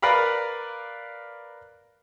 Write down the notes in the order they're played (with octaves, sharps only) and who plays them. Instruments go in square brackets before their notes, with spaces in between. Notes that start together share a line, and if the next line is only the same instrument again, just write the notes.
[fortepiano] A#4 B4 D5 F5 A#5 B5